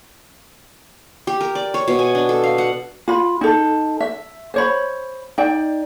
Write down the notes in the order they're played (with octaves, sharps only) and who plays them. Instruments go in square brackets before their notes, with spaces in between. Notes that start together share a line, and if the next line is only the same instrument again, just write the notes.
[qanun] G4
A#4
D5
C#5
B2
G#5
D4
A4
F5
F#5
[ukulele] F4 B5
D#4 A4
E5
C5 C#5 B5
D#4 D5 G5